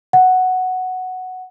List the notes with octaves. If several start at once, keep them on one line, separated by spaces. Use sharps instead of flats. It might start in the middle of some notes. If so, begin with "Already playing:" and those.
F#5